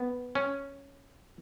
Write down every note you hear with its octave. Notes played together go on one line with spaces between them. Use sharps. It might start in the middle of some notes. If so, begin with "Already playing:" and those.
Already playing: B3
C#4